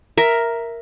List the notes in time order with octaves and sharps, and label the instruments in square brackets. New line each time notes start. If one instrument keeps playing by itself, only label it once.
[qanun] A#4 E5